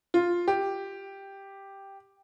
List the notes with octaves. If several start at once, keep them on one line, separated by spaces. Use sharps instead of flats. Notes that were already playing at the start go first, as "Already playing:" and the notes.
F4
G4